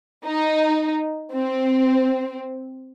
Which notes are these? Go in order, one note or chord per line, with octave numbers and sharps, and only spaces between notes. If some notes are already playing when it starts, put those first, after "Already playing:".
D#4
C4